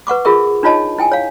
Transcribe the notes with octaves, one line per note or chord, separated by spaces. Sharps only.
B4 F#5 C#6 D6
F4 G#4 A#4 E5 C#6
D4 D#4 F4 C#5 D#5 A5
E4 G5 G#5
C#5 F5